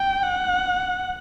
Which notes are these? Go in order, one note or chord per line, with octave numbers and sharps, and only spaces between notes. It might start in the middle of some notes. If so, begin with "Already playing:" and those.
Already playing: G5
F#5